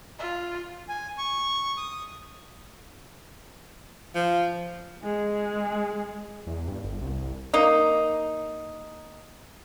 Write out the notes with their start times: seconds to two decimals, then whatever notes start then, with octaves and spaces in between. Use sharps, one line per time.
0.19 F4
0.89 G#5
1.18 C#6
1.77 D#6
4.15 F3
5.04 G#3 G#4
6.47 E2
6.68 G2
6.84 G1
7.01 C2
7.54 A#3 D#4